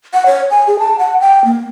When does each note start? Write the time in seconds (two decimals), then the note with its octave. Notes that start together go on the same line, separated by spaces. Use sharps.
0.14 F#5
0.26 C#5
0.51 G#5
0.67 G#4
0.79 A5
0.99 F#5
1.20 G5
1.45 A#3